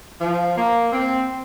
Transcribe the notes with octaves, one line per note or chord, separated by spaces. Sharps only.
F3
A#3
C4